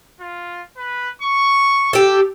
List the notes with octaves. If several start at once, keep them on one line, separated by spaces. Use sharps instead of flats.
F4
B4
C#6
G4 A4 E6